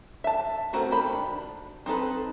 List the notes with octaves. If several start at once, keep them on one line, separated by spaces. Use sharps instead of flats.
E5 A5
A3 B3 C4 F#4 A#4
D#3 G4 B5
D4
C4 D#4 F4 A4 B4